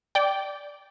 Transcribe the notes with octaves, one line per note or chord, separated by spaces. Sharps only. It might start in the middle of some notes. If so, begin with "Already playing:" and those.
D5 G5